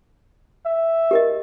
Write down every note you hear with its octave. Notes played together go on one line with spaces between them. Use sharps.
E5
G4 A#4 D#5